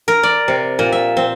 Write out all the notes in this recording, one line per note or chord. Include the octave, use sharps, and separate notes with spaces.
A#4
D5
C3
A#2
E5
C4